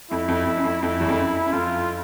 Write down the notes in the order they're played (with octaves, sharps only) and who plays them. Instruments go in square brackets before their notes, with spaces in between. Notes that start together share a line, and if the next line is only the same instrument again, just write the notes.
[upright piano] F2 [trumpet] E4
[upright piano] F2
F2
F#2
F2
[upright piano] F2 [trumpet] E4
[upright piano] E2
F2
F#2
F#2
[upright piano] F2 [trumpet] F4